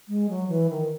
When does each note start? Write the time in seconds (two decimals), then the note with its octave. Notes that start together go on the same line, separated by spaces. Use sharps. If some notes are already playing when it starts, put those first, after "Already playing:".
0.09 G#3
0.29 F#3
0.49 E3
0.70 D#3